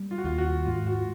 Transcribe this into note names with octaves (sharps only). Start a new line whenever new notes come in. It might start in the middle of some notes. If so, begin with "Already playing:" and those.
Already playing: G3
F4
F#4
D#2 F4
F#4
G#2 F4
F#4